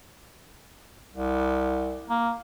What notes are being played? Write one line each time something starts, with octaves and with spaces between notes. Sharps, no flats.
C2
A#3